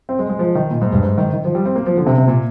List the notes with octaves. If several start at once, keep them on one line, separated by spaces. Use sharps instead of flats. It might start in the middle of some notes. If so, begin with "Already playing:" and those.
C4
G#3
G#3
F3
D#3
A#2
G#2
G2
G#2
D#3
D#3
F3
G3
C4
A#3
F3
D3
C3
C3
A#2